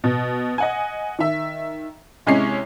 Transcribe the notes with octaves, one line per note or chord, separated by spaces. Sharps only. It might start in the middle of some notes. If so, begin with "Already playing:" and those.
B2
D#5 F#5 G#5
D#3 E5
C3 G#3 C#4 E4 C#5 C7